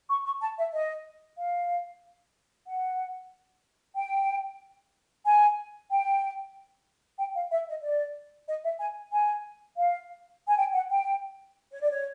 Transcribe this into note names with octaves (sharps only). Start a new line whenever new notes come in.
C#6
C#6
A5
E5
D#5
F5
F#5
G5
G#5
G5
G5
F5
E5
D#5
D5
D#5
E5
G#5
G#5
F5
G#5
G5
F#5
G5
C#5
D5
C#5